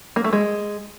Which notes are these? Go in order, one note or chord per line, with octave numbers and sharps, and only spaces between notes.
A#3
A3
G#3